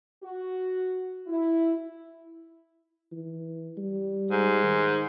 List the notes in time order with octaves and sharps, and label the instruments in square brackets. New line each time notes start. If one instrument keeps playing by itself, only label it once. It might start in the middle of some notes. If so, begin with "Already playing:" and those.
[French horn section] F#4
E4
[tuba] E3
G3
[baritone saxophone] G#2
[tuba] D#3